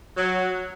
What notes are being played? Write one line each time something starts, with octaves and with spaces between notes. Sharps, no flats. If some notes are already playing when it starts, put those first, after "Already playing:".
F#3